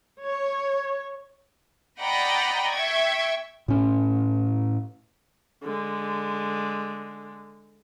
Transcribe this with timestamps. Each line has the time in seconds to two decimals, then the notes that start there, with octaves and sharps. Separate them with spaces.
0.24 C#5
2.01 D5 D#5 F#5 G5 A#5 B5
2.72 E5 G5 C#6 G#6
3.68 A2 C#4
5.63 D3 G#3